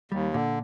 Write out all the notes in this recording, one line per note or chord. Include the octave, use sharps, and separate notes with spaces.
D#2 G3
A#2 D3